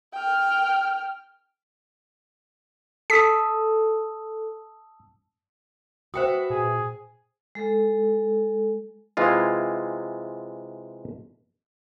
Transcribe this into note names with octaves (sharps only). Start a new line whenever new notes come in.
G5 F6
A4 A5 D#6 E6 B6
F#4 B4 C5 E5 G5 D#6
A#2 G#4
G#3 A4
C3 E3 G#3 F4